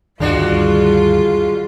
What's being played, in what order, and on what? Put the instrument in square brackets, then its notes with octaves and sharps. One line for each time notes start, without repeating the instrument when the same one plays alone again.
[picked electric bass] D2 G2 D#3 [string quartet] G3 F4 [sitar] G#3 D4 F#4